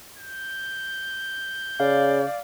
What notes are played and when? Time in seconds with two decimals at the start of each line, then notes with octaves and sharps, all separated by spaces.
0.17 G6
1.80 C#3 D5 F5